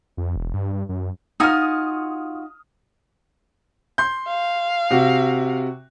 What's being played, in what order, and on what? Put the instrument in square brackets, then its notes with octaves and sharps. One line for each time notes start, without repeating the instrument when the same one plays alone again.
[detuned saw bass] F2
E1
G2
G2
F#2
[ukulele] D#4 [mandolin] F4 F#4 G#5 [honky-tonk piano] D#6 F6
[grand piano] C6 G6
[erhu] F5
[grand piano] C3 F#4